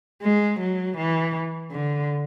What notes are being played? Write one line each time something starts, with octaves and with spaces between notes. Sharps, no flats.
G#3
F#3
E3
D3